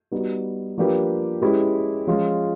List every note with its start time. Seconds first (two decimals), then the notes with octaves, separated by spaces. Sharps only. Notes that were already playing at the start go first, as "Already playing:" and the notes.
0.12 G3 B3 D#4 F#4
0.77 F3 A#3 D4 G4 B4
1.42 G#3 C#4 E4 G4 B4
2.07 F3 G#3 C#4 F4